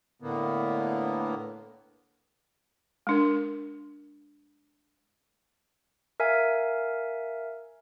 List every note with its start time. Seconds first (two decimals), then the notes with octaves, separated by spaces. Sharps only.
0.22 A2 D3 A#3 B3
3.07 G#3 D4 A#4
6.20 A#4 E5 F5 G#5